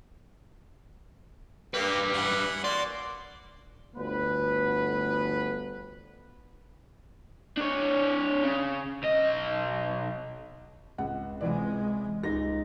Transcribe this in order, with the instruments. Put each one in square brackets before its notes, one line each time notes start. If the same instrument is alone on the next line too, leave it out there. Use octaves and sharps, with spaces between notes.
[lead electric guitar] G3 B4 [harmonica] A#3 G4
[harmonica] E3 F#5
[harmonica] A#3 F#4 C6 [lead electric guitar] D5
[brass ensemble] G1 D2 B3 B4
[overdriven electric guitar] D4 C#5
C#3
B1 D#5
[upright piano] C#2 [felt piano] F#5
[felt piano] C3 E3 D5 [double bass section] G#3
[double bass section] C#2 [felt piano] G#3 [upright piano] D#4 A#6